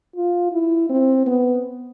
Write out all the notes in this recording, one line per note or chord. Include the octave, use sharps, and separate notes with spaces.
F4
E4
C4
B3